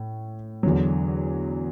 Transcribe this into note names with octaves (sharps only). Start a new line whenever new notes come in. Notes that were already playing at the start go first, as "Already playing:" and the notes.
Already playing: A2
E2 D3 F#3